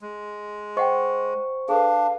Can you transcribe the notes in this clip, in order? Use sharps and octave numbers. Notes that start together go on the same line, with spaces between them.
G#3
C5 D#5 F#5 G5 C#6
D4 G#4 A4 B4 F5